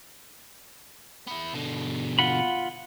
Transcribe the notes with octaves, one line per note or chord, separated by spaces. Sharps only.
B3 E4
B2 D3
F4 F#5 B5